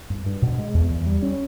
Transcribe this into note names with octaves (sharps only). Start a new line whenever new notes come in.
G2
G2
B2
G#3
E2
E2
G3
C#4